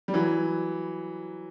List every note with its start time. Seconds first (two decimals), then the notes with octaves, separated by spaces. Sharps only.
0.08 G3
0.14 E3 F#3